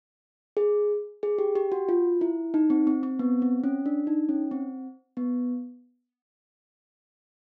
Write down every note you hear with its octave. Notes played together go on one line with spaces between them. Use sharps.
G#4
G#4
G4
G4
F#4
F4
E4
D#4
C4
C4
C4
B3
C4
C#4
D4
D#4
C#4
C4
B3